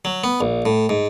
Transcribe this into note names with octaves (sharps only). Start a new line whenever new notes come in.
F#3
B3
A#1
A2
G#2